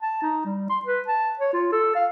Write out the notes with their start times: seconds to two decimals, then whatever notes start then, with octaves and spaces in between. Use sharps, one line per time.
0.02 A5
0.22 D#4
0.45 G3
0.69 C6
0.85 B4
1.08 A5
1.39 C#5
1.53 F4
1.72 A4
1.95 F5